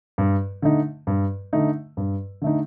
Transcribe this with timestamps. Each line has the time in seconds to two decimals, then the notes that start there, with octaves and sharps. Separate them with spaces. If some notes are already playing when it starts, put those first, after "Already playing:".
0.18 G2
0.62 D3 A3 D#4
1.07 G2
1.53 D3 A3 D#4
1.97 G2
2.42 D3 A3 D#4